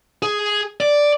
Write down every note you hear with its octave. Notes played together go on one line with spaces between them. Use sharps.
G#4
D5